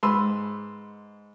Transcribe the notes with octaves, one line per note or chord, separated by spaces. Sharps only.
G#2 B4 C6 E6